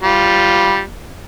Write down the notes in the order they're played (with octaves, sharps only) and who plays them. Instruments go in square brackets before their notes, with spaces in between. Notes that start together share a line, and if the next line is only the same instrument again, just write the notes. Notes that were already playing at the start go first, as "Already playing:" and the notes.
[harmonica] G3 F4